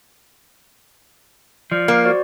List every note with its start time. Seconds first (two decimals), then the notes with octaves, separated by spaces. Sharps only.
1.71 F3 D5
1.88 A#3
2.05 F#4 C5 D5